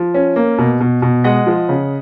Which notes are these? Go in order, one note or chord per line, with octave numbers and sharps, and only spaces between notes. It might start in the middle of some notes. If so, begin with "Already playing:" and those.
Already playing: F3
C#4
A#3
B2
B2
B2
G#3 D#5 F#5
F3
C#3